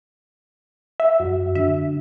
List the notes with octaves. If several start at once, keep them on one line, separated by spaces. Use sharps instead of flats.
E5
F#2 F#4
D3 E5